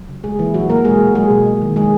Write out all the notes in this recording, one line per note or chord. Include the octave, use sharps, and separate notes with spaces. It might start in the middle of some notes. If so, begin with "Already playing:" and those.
Already playing: F#3
C#3
A#2 G#3 G#4
E3 A#3 E4
F#3 F#4
A#2 A#3 A#4
B2 G#3 G#4
A#3
F#3 G#3 G#4
B2
G#3
D#3
G#3 G#4